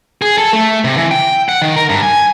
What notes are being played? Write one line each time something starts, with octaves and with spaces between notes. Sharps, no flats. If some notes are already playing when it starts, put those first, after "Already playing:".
G#4
A4
A3
C3
E3
G5
F#5
D#3
A#4
G2
G#5